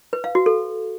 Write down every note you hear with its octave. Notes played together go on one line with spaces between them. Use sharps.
B4
F5
F#4
A4